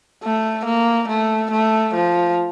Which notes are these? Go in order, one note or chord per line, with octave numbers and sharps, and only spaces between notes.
A3
A#3
A3
A3
F3